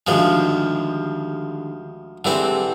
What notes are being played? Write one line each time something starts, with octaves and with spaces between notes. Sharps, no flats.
D2 D3 D#3 F3 G#3 G4
D3 E3 G3 G#3 C4